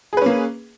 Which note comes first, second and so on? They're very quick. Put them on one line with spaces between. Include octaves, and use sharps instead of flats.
G#4 B4 C#4 A#3